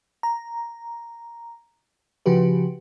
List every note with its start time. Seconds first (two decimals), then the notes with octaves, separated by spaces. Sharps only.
0.23 A#5
2.26 C#3 F3 F#4 G4 B4